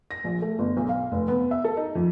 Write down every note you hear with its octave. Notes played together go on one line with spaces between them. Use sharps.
A#6
A#1
A3
G1
B1
F5
F1
B3
E5
A4
D#4
F2